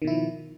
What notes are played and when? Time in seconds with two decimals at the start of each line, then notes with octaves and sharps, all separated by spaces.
0.02 D#3
0.05 B2
0.07 E4
0.10 F3